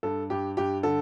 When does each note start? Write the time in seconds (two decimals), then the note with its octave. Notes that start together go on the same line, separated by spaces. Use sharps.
0.03 G2 A4
0.30 G2 G4
0.57 G2 G4
0.83 D3 A4